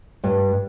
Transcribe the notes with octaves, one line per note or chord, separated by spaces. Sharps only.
G2